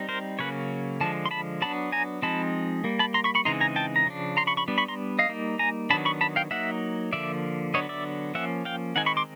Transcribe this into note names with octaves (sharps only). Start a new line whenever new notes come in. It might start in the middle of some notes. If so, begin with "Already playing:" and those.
Already playing: G3 C4 D#4
A#4 C5
C#3 F#3 A#3 C#4 B4 C#5
D3 F3 G#3 A5
C6
A5 B5
F#3 B3 D4 A5 B5
G#5 A#5
F3 G#3 C4 D#4 A5 B5
G3 A#3
A5 B5
A#5 C6
B5 C#6
B5 C#6
C#3 E3 G#3 C4 D#4 A#5 C6
G#5 A#5
G5 A5
A#5
C#3 F3 D4
A#5 C6
B5 C#6
B5 C#6
G3 B3 D4
B5 C#6
A#5 C6
D#5 F5
G3 A#3 D#4
G#5 A#5
D#3 F#3 B3 D4 A5 B5
B5 C#6
A5 B5
F5 G5
F#3 A#3 D#4 E5 F#5
D3 F3 A#3 D5 E5
D3 F#3 B3 D4 C#5 D#5
D5 E5
F3 A#3 C#4 E5 F#5
F5 G5
D#3 G#3 C4 D#4 F#5 G#5
B5 C#6
C6 D6